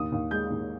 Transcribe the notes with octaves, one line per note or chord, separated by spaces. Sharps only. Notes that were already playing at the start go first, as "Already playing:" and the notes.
Already playing: D#2 D#6
D#2
G#3 G6
D#2